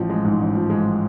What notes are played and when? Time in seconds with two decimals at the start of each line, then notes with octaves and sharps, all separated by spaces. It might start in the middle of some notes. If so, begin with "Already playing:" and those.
Already playing: A1 F3
0.09 G#3
0.24 G#2
0.39 A1
0.55 F3
0.70 G#3